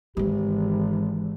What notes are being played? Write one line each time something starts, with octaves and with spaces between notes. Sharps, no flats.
G#1 E3 G#3 G4